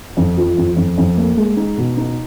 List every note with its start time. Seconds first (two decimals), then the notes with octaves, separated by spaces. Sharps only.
0.17 F2
0.37 F3
0.57 F2
0.77 F2
0.98 F2
1.17 A#3
1.37 G#3
1.57 D#4
1.77 B2
1.97 D#4